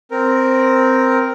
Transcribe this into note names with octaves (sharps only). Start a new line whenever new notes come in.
C4 A#4